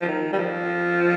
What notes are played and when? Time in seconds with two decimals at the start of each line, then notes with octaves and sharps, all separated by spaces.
0.01 F3
0.08 D#3
0.33 G3
0.38 F3